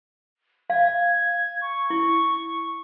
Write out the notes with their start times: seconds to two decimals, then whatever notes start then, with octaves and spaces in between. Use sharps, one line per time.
0.70 F5 G#6
1.61 C#6
1.90 E4